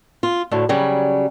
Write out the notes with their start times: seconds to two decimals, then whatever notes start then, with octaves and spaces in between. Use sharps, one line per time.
0.23 F4
0.51 D2 A2 D3
0.69 C#3 F#3 G3